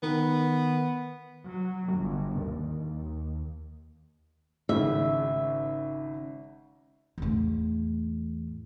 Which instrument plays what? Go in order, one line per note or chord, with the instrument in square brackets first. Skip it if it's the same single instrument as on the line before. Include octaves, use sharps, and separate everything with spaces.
[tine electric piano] D#3 [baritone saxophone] B3
[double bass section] F#3
G1
D#2
[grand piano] G#1 C#3 [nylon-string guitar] E5
[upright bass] E2 A2